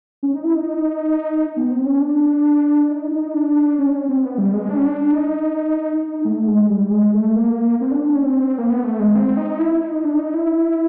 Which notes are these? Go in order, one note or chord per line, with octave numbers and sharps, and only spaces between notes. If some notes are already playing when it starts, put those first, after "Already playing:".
C#4
D#4
E4
D#4
B3
C4
C#4
D4
D#4
D#4
D4
C#4
C#4
C4
B3
G3
G#3
D4
C#4
D4
D#4
D#4
A3
G#3
G3
G#3
A3
A#3
C4
D4
D4
C#4
C4
A#3
B3
A3
G#3
C4
D#4
E4
D#4
D4
D#4
E4